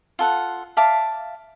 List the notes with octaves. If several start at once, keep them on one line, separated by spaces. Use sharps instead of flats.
F4 A4 F#5
E5 F5 A5 D6